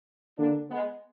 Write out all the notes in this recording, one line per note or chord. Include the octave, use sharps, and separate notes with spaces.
D3 A#3 D4
G#3 B3